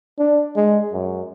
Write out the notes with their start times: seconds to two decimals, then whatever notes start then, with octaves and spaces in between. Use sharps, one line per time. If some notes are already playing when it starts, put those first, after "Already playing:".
0.18 D4
0.56 G#3
0.93 F#2